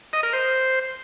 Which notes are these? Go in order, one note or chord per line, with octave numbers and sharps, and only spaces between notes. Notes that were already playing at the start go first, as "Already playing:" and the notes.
D#5
A#4
C5